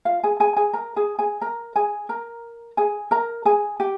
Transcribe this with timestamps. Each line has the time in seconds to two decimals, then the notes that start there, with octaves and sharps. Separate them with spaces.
0.05 F4 F5
0.23 G#4 G#5
0.40 G#4 G#5
0.57 G#4 G#5
0.73 A#4 A#5
0.96 G#4 G#5
1.19 G#4 G#5
1.41 A#4 A#5
1.76 G#4 G#5
2.09 A#4 A#5
2.77 G#4 G#5
3.11 A#4 A#5
3.45 G#4 G#5
3.80 G4 G5